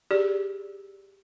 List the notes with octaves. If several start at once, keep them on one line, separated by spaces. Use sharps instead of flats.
G4 G#4 D5